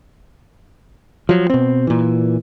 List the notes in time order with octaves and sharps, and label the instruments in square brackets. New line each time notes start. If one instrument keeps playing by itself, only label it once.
[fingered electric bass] F3 F#3
B2 C4
A#2 E3